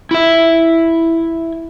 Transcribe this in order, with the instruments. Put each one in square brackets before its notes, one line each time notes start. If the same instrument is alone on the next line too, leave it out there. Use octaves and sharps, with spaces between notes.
[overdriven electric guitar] E4 E5